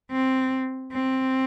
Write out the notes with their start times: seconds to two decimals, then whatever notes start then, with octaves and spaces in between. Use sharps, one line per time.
0.11 C4
0.93 C4